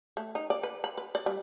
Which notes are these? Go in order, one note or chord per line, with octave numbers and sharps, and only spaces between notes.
A3
D#4
D5
B4
B5
B4
D5
G3